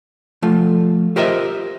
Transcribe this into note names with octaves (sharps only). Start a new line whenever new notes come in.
F3 A3 F4
F4 G4 A#4 C5 D#5 E5